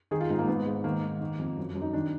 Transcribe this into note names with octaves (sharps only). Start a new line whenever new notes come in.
D#3 G#4
F4
G#2 D#4
A#3
G#2 B3
G#2
D#3 A#3
D#3
D#3
F2
F#2
F#2
D#4
D#3 D4